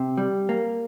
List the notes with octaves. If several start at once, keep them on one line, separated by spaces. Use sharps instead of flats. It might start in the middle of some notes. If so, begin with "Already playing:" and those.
Already playing: C3
G3
A#3